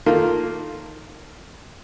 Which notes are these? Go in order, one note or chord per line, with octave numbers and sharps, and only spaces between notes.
D#3 A3 A#3 F4